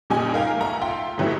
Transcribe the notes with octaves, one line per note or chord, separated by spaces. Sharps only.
F#1 A#2 G3 D#5 G5 G#5
D#4 G#4 A#4 F5 G5
B1 A3 F#5 A#5
F4 E5 G5 C6
G#2 C#3 E3 F#3 G3 A3